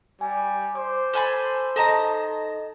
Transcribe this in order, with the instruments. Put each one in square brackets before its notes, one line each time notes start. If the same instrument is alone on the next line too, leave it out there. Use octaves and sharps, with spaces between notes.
[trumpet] G3 [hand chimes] G#5
[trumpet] C5 [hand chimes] D6
[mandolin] A4 G#5 B5
[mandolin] D#4 A5 A#5 [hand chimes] A4 D#5